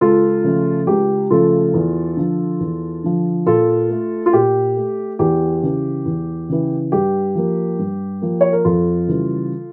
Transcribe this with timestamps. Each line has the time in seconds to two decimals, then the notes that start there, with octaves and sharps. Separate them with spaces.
0.01 C#2 F4 A4
0.44 C#3 F3 A3
0.87 C#2 G4
1.30 C#3 F3 A3 F4 A4
1.74 E2
2.17 D3 F3
2.60 E2
3.04 D3 F3
3.46 A#2 F4 A4
3.90 A3
4.26 F4
4.33 A#2 G4
4.76 A3
5.19 E2 G4
5.63 C#3 E3
6.05 E2
6.49 C#3 E3
6.92 G2 G4
7.35 F3 A#3
7.79 G2
8.22 F3 A#3
8.41 C#5
8.52 A#4
8.65 F2 F4 A4
9.08 C#3 E3 G3